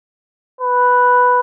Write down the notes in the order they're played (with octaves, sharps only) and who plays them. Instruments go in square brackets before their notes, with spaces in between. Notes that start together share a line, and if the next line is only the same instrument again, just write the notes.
[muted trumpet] B4